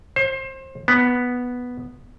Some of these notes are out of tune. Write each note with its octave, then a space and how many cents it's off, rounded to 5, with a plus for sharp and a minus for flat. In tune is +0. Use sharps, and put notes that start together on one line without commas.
C5 +30
B3 -5